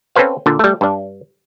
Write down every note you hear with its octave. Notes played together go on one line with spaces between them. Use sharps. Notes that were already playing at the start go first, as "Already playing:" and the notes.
C4 C#4 A4 B4 C5 F5
A#2 D3 D4
G3 A3
G2 D4